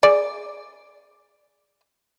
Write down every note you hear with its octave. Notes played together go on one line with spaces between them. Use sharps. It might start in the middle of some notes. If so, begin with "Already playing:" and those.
G#4 D5